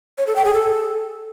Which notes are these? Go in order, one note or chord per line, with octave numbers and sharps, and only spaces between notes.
C#5
A4
G5
G#4
A4